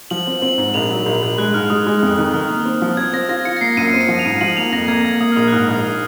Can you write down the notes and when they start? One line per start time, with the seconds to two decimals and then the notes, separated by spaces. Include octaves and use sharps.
0.11 F3 F#7
0.27 C4
0.42 C4 F#7
0.58 G#2
0.74 A#1 F7
0.90 F#3
1.06 A#1
1.22 A#1
1.38 G#3 F#6
1.54 G#2 F6
1.70 G#3 D#6
1.86 G#3
2.02 F2
2.18 D#3
2.33 D#3 F6
2.50 A#3
2.65 C4
2.82 F3
2.97 C4 G#6
3.13 C4 A#6
3.29 F4 A#6
3.45 F4 C#7
3.57 A#6
3.61 A#3 C7
3.77 F#2 D#7
3.89 C4 C#7
4.01 D#7
4.08 F3
4.19 F7
4.25 G#2 D#7
4.41 F3 F#7
4.57 A#3 F7
4.72 F2 A#6
4.88 A#3 G#6
5.04 A#3 G#6
5.20 A#3 D#6
5.32 F6
5.36 A#1 D#6
5.48 F#6
5.52 G#2 F6
5.68 A#1 D#6